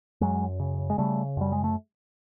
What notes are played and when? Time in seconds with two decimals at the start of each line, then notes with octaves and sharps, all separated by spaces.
0.21 F#2 F#3 G#3
0.59 C#3
0.90 G#3
0.98 C#3 G3 A3
1.37 F#2 G3
1.52 G#3
1.64 A3